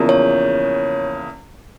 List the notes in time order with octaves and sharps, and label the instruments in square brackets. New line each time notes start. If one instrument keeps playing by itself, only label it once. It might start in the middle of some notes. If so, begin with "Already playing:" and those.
Already playing: [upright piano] E2 C#3 F3 A#3
[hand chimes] C#5